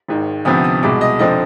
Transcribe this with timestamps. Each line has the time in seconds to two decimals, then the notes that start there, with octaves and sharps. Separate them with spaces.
0.08 G#1 G#2 D#3
0.45 D2 C3 F3 B3 D#6
0.64 D#6
0.82 C2 B2 G#3 D6
1.01 D#5
1.19 F1 D3 F3 C4 D#5